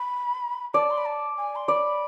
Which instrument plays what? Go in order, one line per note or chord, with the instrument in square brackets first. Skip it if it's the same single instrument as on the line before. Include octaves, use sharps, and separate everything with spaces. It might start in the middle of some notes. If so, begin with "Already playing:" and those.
Already playing: [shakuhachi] B5
[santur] D5 [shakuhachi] A5
[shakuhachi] C6
B5
A5
G#5
C6
[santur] D5 [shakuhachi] B5